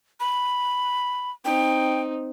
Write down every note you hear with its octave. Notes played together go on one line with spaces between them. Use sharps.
B5
C4 D#4 G5